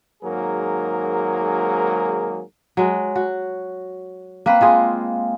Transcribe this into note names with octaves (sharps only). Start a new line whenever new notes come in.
G#1 G#2 F#3 A#3 G#4 A#4
F#3 G#3
F#4
A#3 C4 B4
G#3 F4 G#4